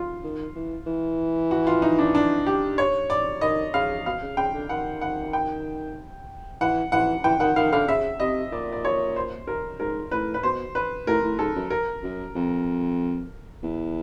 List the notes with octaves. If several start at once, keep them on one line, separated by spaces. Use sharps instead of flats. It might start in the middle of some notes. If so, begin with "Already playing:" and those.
Already playing: F4
D#3
E3
E3
F#4
F4
D#4
D4
D4
G4
C#5
D5
D#3 D#5
C#3 F5
B2 F5
C#3
C#3 G5
D3
D#3 F#5
F#5
G5
E3 F#5
E3 F#5
E3 G5
D#3 F#5
D#3 F5
D3 F5
C#3 E5
C3 D#5
A#2 D5
D5
C#5
C5
A#4
G#2 A#4
A2 B4
B4
B2 C5
B4
A2 A#4
A2
G#2 A4
F#2
A#4
F#2
F2
E2